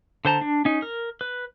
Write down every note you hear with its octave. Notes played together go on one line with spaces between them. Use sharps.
D3 C5 A5 A#5
D4
C#4 D#4
A#4
B4